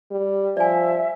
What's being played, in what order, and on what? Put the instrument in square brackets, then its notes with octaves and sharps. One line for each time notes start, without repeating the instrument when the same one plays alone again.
[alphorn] G3
[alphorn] F3 [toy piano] D5 G#5 [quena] E5